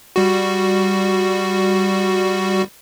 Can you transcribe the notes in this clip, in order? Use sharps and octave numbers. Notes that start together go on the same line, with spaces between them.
G3 F#4